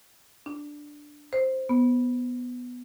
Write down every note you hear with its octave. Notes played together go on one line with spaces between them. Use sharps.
D4
C5
B3